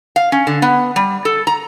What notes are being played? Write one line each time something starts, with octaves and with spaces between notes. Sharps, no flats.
F5
C#4
D3
B3
G3
A4
A#5